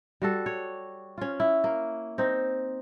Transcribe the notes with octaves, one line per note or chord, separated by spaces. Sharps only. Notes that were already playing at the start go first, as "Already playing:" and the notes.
G3 F#4 A4
C#5
C#4 F4
E4
A#3
C4 D#4